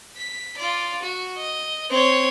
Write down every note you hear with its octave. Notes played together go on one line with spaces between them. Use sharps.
B6
F4 D5
F#4
D#5
C4 C#5